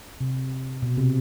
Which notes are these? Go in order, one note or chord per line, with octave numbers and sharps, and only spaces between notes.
C3
B2
C3